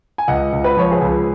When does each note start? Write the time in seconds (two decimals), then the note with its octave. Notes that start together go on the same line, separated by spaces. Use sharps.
0.18 G#5
0.28 C#2 D#5 F#5
0.52 C#2
0.64 B4
0.77 F3 C#5
0.91 G#4 B4
1.01 C#2